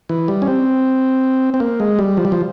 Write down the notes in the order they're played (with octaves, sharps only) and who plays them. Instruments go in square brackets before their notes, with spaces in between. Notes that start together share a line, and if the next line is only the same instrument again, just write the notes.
[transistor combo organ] E3
G3
C#4
C4
C4
A#3
G#3
G3
F3
G3
F3